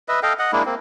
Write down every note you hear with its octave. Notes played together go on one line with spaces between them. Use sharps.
B4 D#5 E5
A4 D#5 F5 G5
D#5 F#5
G#3 A#3 D4 E4
A#3 C4